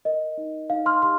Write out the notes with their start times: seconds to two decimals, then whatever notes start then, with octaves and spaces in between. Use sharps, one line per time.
0.05 A#4 D#5
0.38 D#4
0.70 D#4 F5
0.86 C6 F6
1.02 G4 C6 F6